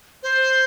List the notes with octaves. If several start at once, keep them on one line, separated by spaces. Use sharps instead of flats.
C5